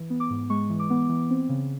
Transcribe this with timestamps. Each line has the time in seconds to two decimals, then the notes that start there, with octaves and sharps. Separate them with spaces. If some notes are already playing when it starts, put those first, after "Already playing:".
Already playing: E3
0.10 B3
0.20 D6
0.30 G#2
0.50 G#3 C#6
0.70 E3
0.79 D6
0.90 B3
1.09 E3
1.30 C4
1.49 C#3